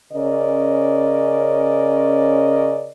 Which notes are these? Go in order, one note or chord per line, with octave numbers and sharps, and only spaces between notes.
C#3 C#4 A#4 D5 D#5